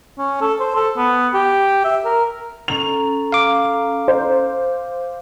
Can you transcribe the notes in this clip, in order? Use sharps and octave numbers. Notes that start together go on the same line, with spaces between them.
C#4
A4
C5
A4
B3
G4
E5
A#4
C#4 A4 A#5 F7
F5 D6
C5